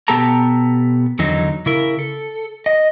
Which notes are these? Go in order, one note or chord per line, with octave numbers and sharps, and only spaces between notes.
B2 B3 G4 A4 A5 A#5
E2 D3 D#3 F#3 D#4
C#3 E4 A#4
A4
D#5